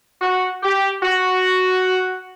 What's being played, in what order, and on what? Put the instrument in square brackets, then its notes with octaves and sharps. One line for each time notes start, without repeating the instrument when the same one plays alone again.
[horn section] F#4
G4
F#4